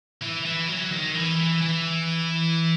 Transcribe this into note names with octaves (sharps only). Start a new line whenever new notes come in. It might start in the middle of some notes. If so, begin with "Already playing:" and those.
E3
E3
F#3
D#3
E3
E3